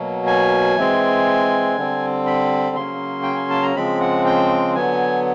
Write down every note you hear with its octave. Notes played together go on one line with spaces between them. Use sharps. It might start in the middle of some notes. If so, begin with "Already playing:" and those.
Already playing: B2 F#3 A#3
G#5
E3 G#3 C4
D3 G3 C4
B5
C#3 F#3 A#3 C#4 C6
G5
G#5
A5
A#5
C#3 F3 G#3 C4 B5
F#5
G5
D3 F#3 B3 G#5